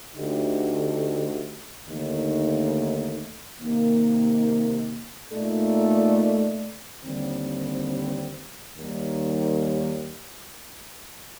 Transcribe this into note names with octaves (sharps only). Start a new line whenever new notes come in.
D2 D3 A3 D#4 G4
D#2 D3 A3 D#4
C3 D#3 A#3 D#4
A#2 A3 D#4 A4 D5
D#2 D3 G3 C4
D#2 D#3 G3